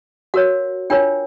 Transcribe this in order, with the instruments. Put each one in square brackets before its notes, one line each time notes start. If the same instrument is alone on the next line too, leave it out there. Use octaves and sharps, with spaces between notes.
[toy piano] F#4 A#4 C#5 F#5
D4 F4 A#4 C#5 G5